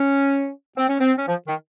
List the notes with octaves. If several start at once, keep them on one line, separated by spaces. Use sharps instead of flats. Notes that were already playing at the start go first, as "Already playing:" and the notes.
Already playing: C#4
C4
C#4
C4
C#4
F3
D#3